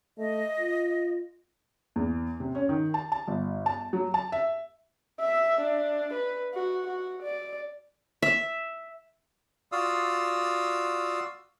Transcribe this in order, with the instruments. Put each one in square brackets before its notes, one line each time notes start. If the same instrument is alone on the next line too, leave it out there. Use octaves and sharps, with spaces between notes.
[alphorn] A3 [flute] D#5
[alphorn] F4
[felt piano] E2
C3
C#4
D#3
A5
A5
G1
A5
F#3
A5
E5
[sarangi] E5
D4
B4
F#4
F#4
D5
[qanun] E5
[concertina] F4 F#4 D5 F5 D#6 E6